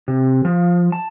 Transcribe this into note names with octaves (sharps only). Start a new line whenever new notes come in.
C3
F3
A5